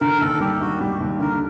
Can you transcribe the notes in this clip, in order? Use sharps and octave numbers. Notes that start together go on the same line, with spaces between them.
D3 A#4
D#2 A4
G3 G4
D#2 F#4
G3 G4
D#2
D3 A#4